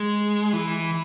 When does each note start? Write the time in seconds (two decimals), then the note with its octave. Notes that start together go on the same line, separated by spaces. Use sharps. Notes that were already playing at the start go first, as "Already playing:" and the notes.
Already playing: G#3
0.53 E3